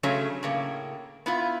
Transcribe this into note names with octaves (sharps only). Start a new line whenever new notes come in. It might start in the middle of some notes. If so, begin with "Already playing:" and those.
C#3 F#3 A3 C#4
A2 C#3 A#3
B3 E4 F4